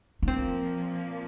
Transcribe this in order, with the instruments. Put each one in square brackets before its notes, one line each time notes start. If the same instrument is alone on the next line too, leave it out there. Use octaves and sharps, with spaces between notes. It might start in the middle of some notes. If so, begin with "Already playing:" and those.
[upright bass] D4
[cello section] A#2 F3 A#3 [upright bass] C4